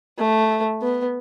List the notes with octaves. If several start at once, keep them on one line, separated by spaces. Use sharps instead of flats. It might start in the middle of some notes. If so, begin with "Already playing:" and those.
A3
B3